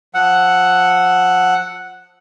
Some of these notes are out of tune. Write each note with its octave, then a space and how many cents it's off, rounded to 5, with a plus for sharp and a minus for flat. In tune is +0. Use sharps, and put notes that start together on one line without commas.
F3 +20 F#5 +0 E6 +0